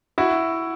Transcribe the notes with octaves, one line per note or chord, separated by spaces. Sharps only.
E4 F#4